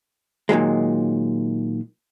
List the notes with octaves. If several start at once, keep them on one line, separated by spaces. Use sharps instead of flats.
A#2 D#3 F#3 G#3